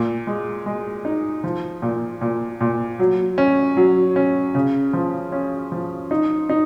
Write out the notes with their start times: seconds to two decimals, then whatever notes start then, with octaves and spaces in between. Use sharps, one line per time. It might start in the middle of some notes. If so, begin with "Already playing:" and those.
Already playing: A#2
0.27 G#3
0.66 G#3
1.05 D#4
1.44 F3
1.82 A#2
2.21 A#2
2.61 A#2
2.99 F#3
3.38 C#4
3.77 F#3
4.16 C#4
4.55 C#3
4.93 F3
5.32 C#4
5.72 F3
6.11 D#4
6.49 D#4